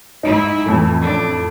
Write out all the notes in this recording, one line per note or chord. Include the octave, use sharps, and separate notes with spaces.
G#2 D#4 E4
F2 A2 E3
D4